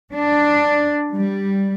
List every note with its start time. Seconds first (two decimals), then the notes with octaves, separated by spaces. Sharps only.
0.14 D4
1.16 G3